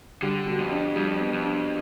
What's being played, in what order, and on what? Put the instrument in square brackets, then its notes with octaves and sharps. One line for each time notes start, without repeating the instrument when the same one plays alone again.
[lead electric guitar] D3 [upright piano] G3
[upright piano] B2
[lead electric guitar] F2
[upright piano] D4
[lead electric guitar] F2 [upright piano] G3
[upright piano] B3
[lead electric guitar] F2
[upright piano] D4